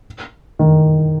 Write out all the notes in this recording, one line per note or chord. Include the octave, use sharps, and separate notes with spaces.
D#3